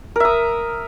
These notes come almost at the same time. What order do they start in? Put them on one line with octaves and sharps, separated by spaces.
A#4 E5 D#6